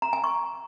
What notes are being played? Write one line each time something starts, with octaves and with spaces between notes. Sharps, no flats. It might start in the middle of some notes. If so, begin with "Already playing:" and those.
A#5
G#5
C#6